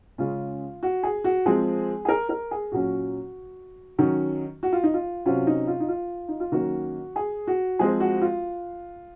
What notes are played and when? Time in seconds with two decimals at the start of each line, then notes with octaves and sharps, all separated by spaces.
0.18 C#3 G#3 C#4 F4
0.83 F#4
1.03 G#4
1.24 F#4
1.46 F3 G#3 C4 G#4
2.05 G#4
2.09 A#4
2.29 A#4
2.51 G#4
2.72 A#2 F#3 C#4 F#4
3.98 D#3 F#3 C#4
4.63 F#4
4.73 F4
4.83 D#4
4.94 F4
5.26 C3 F#3 C#4 F4
5.47 D#4
5.67 F4
5.80 D#4
5.88 F4
6.28 D#4
6.40 F4
6.52 D#3 F#3 A#3 C#4 F#4
7.16 G#4
7.47 F#4
7.79 F3 G#3 C4 G#4
8.00 F#4
8.21 F4